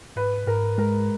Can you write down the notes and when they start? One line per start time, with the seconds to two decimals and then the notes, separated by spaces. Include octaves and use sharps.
0.16 G#2 B4
0.47 G#2 A#4
0.78 G#3 A#4